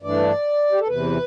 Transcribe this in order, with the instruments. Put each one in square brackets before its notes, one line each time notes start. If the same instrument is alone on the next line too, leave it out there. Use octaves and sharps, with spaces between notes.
[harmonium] G2 E3 A3 D4 D5
G4
A4
E2 C3 E3 B4